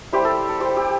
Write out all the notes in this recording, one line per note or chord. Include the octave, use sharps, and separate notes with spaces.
G3 E4 G4 C5
A4
A4
G4 C5
G4